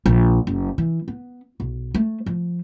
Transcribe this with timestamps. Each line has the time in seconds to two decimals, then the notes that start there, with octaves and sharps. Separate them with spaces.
0.06 A#1
0.47 F#1
0.78 E3
1.08 B3
1.60 B1
1.95 A3
2.26 F3